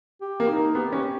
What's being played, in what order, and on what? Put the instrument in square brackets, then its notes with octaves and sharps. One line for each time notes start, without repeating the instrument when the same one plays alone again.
[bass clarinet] G4
[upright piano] A#3
[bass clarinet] D#4
[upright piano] A#3
[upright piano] B3 [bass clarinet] G4
[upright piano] C#4